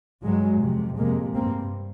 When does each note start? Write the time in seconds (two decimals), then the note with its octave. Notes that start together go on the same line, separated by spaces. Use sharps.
0.23 G2 F#3 G#3
0.61 F2 C3
0.98 F2 C3 G#3 A#3
1.35 G2 A#3 C4